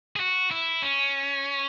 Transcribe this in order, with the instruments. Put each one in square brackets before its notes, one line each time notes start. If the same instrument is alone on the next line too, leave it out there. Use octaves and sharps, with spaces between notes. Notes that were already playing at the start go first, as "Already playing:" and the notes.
[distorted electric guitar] G#4
F#4
E4
C#4